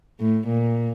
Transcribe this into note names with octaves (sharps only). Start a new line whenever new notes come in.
A2
A#2